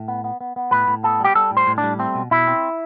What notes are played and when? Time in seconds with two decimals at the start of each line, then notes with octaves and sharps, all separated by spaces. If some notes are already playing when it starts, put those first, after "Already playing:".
Already playing: A2
0.08 B3
0.24 B3
0.41 B3
0.56 B3
0.71 A2 B4
0.88 A2
1.03 B3 A4
1.20 G3 G4
1.35 G3 A4
1.51 A2
1.57 C5
1.67 A2
1.78 D4
1.83 G3
1.99 A3 C4
2.15 B2
2.31 B2 E4
2.47 C4